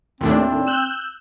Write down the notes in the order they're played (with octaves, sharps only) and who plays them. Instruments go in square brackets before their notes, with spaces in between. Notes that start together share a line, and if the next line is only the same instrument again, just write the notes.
[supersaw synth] D#2 A2 D4 [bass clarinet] C4
[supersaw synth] E6 F#6 G6